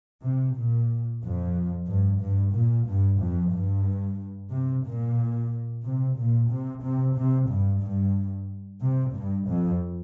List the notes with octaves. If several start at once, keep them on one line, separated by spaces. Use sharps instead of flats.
C3
A#2
F2
G2
G2
A#2
G2
F2
G2
C3
A#2
C3
A#2
C3
C3
C3
G2
G2
C3
G2
F2